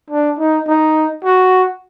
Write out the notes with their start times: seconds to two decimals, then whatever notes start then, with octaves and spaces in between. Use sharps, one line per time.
0.10 D4
0.39 D#4
0.67 D#4
1.24 F#4